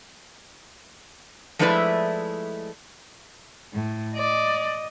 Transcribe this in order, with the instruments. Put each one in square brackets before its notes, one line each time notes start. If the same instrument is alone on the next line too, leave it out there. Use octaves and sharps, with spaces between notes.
[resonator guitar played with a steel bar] F3 G#3 A3 E4 B4 D5
[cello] A2
[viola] D5 [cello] D#5